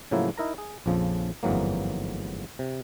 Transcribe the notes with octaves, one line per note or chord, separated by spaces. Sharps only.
A2 C#3 F3 F#3 A#3 E4
D#4 E4 A#4 A#5
G#4
A#1 F2 C#3 F3
G1 F2 G#2 E3 F#3 A#3
C3